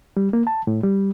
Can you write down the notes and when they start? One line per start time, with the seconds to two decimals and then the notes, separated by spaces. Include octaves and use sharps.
0.17 G3
0.33 A#3
0.47 A5
0.67 A2
0.84 G3